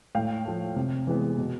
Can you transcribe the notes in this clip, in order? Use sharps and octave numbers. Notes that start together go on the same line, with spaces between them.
A2 F5 G5
F3 A3
C3
E3 G#3 B3
B2